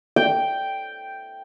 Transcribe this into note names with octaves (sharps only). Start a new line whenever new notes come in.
G5